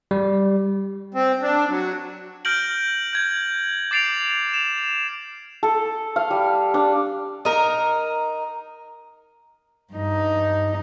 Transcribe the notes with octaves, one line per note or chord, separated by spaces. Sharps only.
G3
C4
D4
F#3
F6 G6 A#6 D7 F#7
G6 G#6 F#7
D6 A6 C7 D7 F7
E7 F7
A4
F5
G3
D4
D#4 A#4
G2 D#4